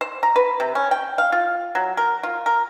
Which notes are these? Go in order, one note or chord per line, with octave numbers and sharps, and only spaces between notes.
C5
A#5
B4
C3
C#4
G5
F5
F4
F#3
A#4
F4
A#4